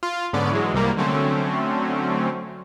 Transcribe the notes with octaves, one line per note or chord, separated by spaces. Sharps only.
F4
G#2 D3 B3 C#4 D5
E3 F#3 G#3
C2 C3 G3 A#3
D3 F#3 A3 C4 C#4